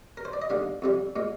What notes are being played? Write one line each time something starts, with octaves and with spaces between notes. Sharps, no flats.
A#4
C5
D5
D#5
D#2 D3 G3 F5
F2 C3 G3
A#2 G#3